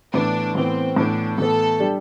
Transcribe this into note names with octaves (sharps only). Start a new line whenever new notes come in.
A2 E3 B3 D4
A2 E3 B3 C4
A2 E3 B3 D4
A2 E3 B3 A4
G3 D4 G4